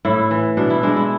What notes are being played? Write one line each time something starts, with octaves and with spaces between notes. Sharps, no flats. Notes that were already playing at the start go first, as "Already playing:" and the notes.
A2 E4
E3
B2 D4
E4
G#3 D4
E4